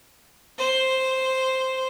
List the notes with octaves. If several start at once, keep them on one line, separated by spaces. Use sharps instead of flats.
C5